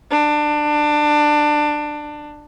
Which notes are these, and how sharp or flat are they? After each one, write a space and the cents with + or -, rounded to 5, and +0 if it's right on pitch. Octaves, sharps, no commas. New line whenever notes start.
D4 +20